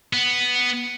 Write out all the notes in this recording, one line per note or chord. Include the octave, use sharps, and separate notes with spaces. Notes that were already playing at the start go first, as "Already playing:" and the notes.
B3